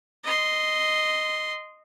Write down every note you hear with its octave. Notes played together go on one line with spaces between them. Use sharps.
D#5 C6